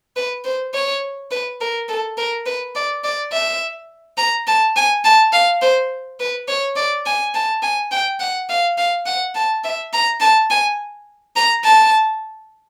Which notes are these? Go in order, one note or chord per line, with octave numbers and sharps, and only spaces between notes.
B4
C5
C#5
B4
A#4
A4
A#4
B4
D5
D5
E5
A#5
A5
G#5
A5
F5
C5
B4
C#5
D5
G#5
A5
G#5
G5
F#5
F5
F5
F#5
A5
E5
A#5
A5
G#5
A#5
A5